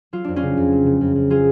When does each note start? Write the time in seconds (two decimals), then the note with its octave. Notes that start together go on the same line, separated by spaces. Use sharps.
0.13 F#3 F4
0.24 F2 D4
0.36 C#4 F4
0.42 C#3
0.57 F2
0.72 F#3
0.86 C#3
1.01 F2
1.15 F2
1.30 F#3 F4 G#4